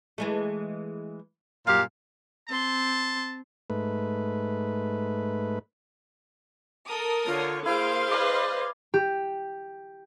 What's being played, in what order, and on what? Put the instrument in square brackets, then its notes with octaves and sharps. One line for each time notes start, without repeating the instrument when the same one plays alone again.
[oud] E3 G#3 A3
[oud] F#2 [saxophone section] A#2 G4 F5
[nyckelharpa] C4 C6 [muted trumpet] A5
[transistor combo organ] G#2 A3 B4
[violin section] A4 A#4 D#6
[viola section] D3 C#5 [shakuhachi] F4
[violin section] A#3 D7 [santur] E4 [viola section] G#4 F5 C6 [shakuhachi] C5
[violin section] B4 D#5 [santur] D5
[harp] G4